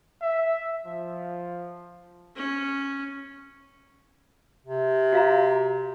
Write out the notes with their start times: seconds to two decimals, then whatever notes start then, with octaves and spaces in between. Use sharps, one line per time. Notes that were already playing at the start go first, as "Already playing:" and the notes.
0.22 E5
0.86 F3
2.36 C#4
4.66 C3
5.13 F#4 F5 A#5